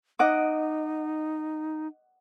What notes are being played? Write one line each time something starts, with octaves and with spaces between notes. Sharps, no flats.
D#4 D#5 F#5 D6